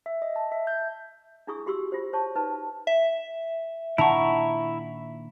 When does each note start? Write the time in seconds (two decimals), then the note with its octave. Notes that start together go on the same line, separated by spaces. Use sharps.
0.06 E5
0.22 D#5
0.36 A5
0.52 E5
0.67 G6
1.47 D4 E4 G#4 C#6 D#6
1.66 F#4 G4 C6 C#6 E6
1.92 F4 G4 C5
2.13 C5 C#5 A5 C#6
2.35 D#4 B4 A5
2.87 E5
3.98 A#2 D#3 D4 E4 F#5 A5 A#5 C#6